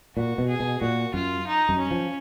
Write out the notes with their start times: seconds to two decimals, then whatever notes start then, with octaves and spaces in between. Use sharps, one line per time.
0.17 A#2 F#4
0.38 B2
0.49 G#4
0.60 B2
0.81 A#2 F#4
1.14 F#2 F4
1.47 D#4
1.69 F#2
1.79 C#4
1.91 F3